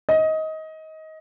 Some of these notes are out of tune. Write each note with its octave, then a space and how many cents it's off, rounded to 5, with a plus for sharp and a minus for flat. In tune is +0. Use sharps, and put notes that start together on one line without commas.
D#5 +20